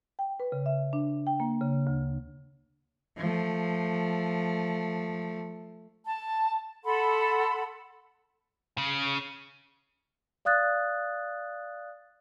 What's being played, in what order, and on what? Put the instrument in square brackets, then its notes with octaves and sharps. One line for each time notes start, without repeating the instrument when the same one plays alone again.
[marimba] G5
B4
C#3
E5
D4
G5
A#3
C#3
D2
[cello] F3 A3
[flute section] A5
A4 F#5 B5 C6
[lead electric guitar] C#3
[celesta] D5 F5 D#6 F#6 A6